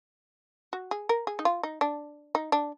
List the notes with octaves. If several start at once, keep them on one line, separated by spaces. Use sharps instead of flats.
F#4
G#4
A#4
G#4
D#4
F4
D#4
D4
D#4
D4